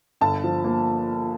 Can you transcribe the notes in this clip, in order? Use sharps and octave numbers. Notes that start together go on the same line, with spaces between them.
G1 A5
F3
A#3